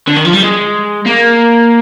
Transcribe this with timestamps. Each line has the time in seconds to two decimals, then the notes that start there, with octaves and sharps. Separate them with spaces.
0.07 D3
0.16 D#3
0.25 F3
0.33 G3
0.42 G#3
1.06 A#3